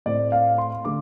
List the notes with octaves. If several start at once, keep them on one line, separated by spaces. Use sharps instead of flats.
A2 A3 C4 D5
F5
C6
D3 A3 D6